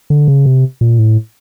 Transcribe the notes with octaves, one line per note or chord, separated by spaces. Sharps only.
D3
C#3
C3
A#2
A2